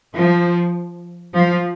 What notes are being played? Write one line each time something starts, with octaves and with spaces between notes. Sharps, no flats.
F3
F3